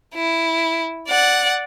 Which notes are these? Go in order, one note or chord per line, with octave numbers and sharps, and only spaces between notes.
E4
D5 F#5